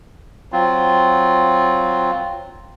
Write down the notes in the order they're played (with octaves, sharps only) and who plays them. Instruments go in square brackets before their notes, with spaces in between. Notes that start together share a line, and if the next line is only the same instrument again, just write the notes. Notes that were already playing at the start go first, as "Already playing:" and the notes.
[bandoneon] F#3 C4 F4